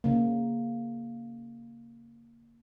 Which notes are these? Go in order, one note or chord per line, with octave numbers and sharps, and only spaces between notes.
C#3 A#3